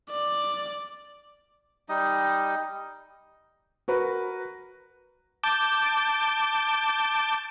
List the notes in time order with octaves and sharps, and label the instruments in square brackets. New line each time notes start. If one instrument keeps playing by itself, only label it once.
[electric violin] D5
[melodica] G3 D#4 D#5
[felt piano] F#4 A#4 B4
[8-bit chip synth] A5 D6 G6